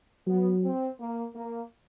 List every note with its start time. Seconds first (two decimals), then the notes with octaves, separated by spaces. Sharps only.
0.27 F#3 B3
0.63 C4
0.99 A#3
1.35 A#3